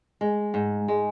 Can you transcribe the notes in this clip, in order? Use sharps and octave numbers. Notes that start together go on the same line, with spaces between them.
G#3
G#2
G#3